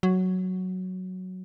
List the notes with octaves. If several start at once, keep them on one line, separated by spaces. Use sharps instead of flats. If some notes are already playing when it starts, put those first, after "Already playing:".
F#3